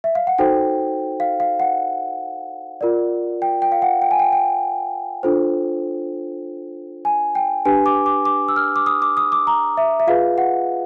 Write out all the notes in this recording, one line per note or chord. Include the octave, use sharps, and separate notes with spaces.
E5
F5
F#5
D#4 F#4 A4 C5 G5
F5
F5
F#5
F4 A#4 D5
G5
G5
F5
F#5
G5
G#5
G5
G5
D4 F4 A4 C5
G#5
G5
D4 G4 B4 G#5
D6
D6
D6
E6
F6
D6
D#6
D6
D#6
D6
A#5
E5
E5
F4 G#4 B4 F5
F#5